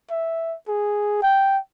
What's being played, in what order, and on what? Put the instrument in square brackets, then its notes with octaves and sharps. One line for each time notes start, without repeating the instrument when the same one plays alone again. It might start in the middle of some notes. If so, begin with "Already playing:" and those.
[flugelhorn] E5
G#4
G5